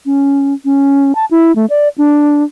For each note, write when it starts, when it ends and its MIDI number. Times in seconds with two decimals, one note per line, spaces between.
0.05 0.54 61
0.65 1.15 61
1.15 1.25 81
1.31 1.54 64
1.55 1.66 57
1.70 1.88 74
1.98 2.43 62